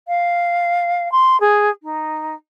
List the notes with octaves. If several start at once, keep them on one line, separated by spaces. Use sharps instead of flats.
F5
C6
G#4
D#4